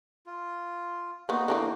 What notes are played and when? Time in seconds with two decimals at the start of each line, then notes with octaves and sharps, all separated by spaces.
0.26 F4
1.29 A#3 B3 D#4 F#4
1.48 D3 E3 A#3